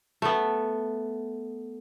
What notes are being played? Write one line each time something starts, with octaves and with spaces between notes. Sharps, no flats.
A3 B3